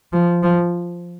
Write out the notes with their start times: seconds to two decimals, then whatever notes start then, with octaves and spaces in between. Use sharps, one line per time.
0.13 F3
0.43 F3